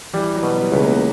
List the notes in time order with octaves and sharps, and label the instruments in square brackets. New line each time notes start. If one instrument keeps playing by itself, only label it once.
[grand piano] E3 [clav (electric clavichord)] G3
[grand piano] F#3
[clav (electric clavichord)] B2
[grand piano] G3
[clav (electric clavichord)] C#2 [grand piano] B3
[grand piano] A#3